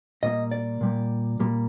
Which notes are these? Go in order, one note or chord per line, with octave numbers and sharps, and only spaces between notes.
A#2 G3 A#3 D#5
D5
A#2 G3 A#3
A#2 G3 A#3